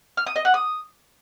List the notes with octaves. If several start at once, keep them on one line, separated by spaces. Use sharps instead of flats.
F6
D#6
D#5
F#5
D#6